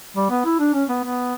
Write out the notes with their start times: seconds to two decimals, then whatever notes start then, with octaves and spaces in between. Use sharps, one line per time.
0.16 G3
0.30 B3
0.45 E4
0.59 D4
0.74 C#4
0.89 B3
1.03 B3